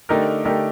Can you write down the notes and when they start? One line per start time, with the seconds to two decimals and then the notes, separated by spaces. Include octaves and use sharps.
0.09 D3 A3 D#4 G4 A#4
0.45 D3 A3 D#4 G4 A#4